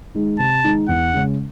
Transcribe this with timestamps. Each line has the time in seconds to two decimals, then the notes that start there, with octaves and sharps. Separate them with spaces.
0.15 D#3 G#3 D#4
0.39 C3 A5
0.64 D#3 G#3 D#4
0.88 E2 F#5
1.14 C#3 G#3 C#4